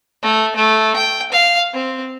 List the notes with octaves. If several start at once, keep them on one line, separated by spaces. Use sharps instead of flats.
A3
A3
G5
F5
C4